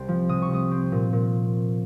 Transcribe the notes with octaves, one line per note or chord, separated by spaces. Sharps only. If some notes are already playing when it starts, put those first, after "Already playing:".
Already playing: C2 C4
F3
C3 D#6
C#6
C2 D#6
C4
A#2
A#2